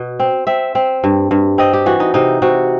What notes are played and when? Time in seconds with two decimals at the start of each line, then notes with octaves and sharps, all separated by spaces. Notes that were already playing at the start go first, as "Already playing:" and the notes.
Already playing: B2
0.20 C4
0.47 C4 E5
0.75 C4
1.04 G2
1.31 G2
1.58 C4 D#5
1.73 G4
1.86 E3 F#4
2.00 D#4
2.14 C3 D#4
2.42 C3 F#4